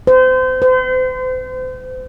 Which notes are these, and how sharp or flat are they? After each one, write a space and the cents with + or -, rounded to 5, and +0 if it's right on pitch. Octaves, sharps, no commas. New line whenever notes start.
C5 -30
C5 -40